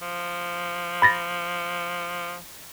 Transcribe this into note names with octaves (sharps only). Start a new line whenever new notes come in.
F3
B5 A6 A#6